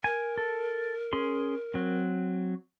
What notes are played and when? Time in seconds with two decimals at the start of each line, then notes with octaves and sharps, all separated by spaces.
0.04 A#4 G#5
0.38 A4
1.13 C#4 G#4 C6
1.74 F#3 C4